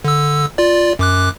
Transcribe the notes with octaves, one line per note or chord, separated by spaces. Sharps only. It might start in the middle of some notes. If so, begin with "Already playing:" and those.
D3 E6
F4 D5
F#2 D6 F#6